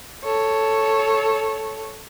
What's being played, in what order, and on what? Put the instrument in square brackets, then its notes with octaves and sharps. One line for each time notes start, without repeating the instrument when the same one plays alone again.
[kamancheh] A4 C#5